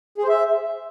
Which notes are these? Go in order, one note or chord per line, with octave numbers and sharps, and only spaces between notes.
G#4
C5
E5